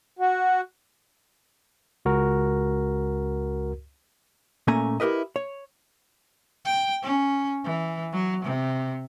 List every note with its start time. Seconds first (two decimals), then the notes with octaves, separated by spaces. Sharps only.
0.19 F#4
2.05 C#2 F#4 A#4
4.67 A#2 A3 A#3 C#4 G#5 A#5
5.00 E4 G4 A#4 B4 D#5
5.36 C#5
6.65 G5
7.03 C#4
7.64 E3
8.13 F#3
8.45 C3